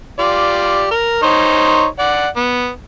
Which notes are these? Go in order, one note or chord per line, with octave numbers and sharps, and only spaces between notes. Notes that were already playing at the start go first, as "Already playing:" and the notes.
F4 G4 D5
A#4
D#4 C5 C#5
D5 F#5
B3